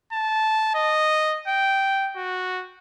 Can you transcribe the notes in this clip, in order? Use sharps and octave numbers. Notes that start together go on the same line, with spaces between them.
A5
D#5
G5
F#4